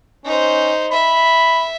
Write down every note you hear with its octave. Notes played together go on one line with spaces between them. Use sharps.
C#4 D#4 C5
E5 B5